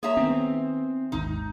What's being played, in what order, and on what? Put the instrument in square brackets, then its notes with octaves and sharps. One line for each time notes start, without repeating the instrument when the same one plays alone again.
[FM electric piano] A#3 C#5 [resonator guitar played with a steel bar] G#4 E5 A#5
[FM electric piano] D#3 B3 [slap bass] C4
[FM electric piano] G#1 D#2 G#2 [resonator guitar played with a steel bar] D#4